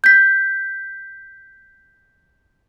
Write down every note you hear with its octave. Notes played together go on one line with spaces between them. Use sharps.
G6 B6